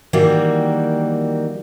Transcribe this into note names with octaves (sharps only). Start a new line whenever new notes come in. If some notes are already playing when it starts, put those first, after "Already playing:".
D#3 E3 G3 A#3 F#4